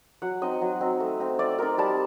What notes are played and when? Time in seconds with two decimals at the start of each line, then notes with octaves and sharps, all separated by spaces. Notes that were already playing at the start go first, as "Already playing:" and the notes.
0.22 F#3 F#5
0.42 C4 D#4 D#5
0.61 F#3
0.81 C4 D#4
1.00 A3
1.20 C4 D#4
1.39 A3 D5
1.58 C4 D#4 A#4
1.78 G3 A5